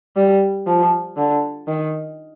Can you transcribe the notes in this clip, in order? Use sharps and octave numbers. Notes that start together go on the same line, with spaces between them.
G3
F3
D3
D#3